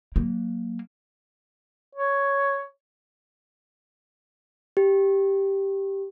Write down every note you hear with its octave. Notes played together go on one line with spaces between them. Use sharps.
F#3 A#3
C#5
G4